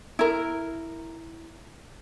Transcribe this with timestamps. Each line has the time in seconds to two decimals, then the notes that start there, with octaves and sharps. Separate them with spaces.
0.19 E4 A#4